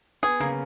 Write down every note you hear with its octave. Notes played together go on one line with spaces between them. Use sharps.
B3 G#4
C#3 A#3 C#4